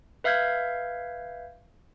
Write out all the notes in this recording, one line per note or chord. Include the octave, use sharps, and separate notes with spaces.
B4 E5 F5 F6 G6 G#6